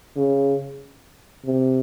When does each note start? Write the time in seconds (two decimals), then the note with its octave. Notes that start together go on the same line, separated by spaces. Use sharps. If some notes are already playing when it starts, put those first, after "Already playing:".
0.17 C#3
1.45 C3